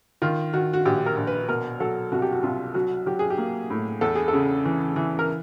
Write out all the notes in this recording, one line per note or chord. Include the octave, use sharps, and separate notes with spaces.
D#3 F4
D#3 F#4
F#4
A#1 G4
A#4
A#1
B4
B2 A#4
F#3 A4
C2 F#4
G4
F#4
C2 F4
F#3 F#4
F#3 G4
G#4
G4
A#3
A2
E2 A4
G#4
A4
C#3
E3
E3
A#4